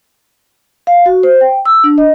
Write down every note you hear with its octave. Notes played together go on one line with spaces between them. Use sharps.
F5
F#4
C5
G5
E6
D4
D#5